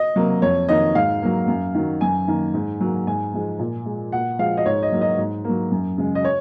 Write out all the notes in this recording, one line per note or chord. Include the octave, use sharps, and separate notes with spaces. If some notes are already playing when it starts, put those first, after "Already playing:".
Already playing: D#5
C3 F#3 A#3
F2 C#5
D#3 A#3 D#5
G#2 F5
F#3 A#3
F#2
D#3 F#3
F#2 G#5
D#3 A#3
G#2
F#3 A#3
G#2 G#5
F3 G#3
A#2
G#3
A#2 F#5
F3 G#3 F5
D#5
G#2 C#5
D#5
F#3 A#3
D#5
G#2
F#3 A#3
F#2
C#3 G#3
D#5
C#5